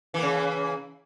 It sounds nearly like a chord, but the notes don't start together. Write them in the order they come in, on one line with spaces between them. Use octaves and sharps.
E3 A#3 C#3